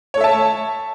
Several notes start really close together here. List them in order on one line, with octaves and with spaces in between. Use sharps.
C#5 A4 E5 A5